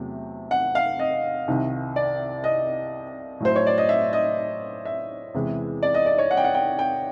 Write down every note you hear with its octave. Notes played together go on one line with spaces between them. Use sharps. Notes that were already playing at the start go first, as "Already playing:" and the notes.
Already playing: E2 C3 F#3 A3
F#5
F5
D#5
C2 C3 D#3
D5
D#5
A2 F#3 A3 C5
C#5
D5
D#5
E5
D#5
E5
E2 C3 E3 G#3
D5
D#5
D5
C#5
F#5
G5
F#5
G5
G5